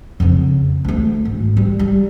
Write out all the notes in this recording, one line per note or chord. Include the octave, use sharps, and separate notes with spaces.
F2 C#3
D2 A3
G#1
G3
G3